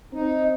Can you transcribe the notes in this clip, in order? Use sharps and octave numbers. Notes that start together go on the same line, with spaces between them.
C4 D#4